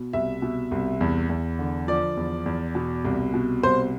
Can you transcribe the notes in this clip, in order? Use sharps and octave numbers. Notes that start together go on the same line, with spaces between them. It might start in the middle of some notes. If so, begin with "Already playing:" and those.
Already playing: B2
C2 E5
B2
C2
E2
E2
D3
F3 D5
E2
E2
B2
C2
B2
C2 C5